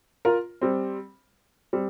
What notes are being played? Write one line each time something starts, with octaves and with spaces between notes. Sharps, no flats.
F4 A#4
G3 C4
G3 C4